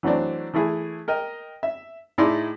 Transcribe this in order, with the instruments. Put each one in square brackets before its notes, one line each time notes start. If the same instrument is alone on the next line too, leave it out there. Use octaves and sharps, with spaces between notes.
[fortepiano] E3 F#3 A3 C4 D4
E3 A3 E4 G#4
A#4 D#5 G5
E5
A2 D#4 E4 G#4 D5 C6